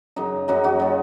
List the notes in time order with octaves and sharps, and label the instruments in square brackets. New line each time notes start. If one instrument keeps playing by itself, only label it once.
[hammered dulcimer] F#2 C#3 F#3 D#4
F#2 C#3 F#3 D#4 F#4
D#4 F#4
C#3 F#3 F4